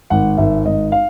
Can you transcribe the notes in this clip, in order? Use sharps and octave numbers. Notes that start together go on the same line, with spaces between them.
G#1 F#5
G#1 E5
G#1 D#5
F5